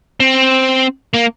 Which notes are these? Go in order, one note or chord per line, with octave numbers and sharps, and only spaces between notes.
C4
A#3